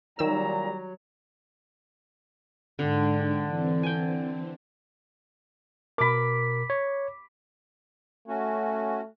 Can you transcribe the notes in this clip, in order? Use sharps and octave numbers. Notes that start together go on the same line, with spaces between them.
A#2 D#3 F#3 G3 A#5 E6
G#2 D3 D4 G5
E3 C4
G5 G#5
B2 A#4 B5 D6
C#5
A3 C#4 F#4